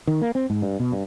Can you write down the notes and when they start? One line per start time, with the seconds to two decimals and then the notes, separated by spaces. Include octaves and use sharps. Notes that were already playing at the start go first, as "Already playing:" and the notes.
0.07 D#3
0.22 A#3
0.35 C4
0.50 G#2
0.62 G2
0.80 B2
0.92 G2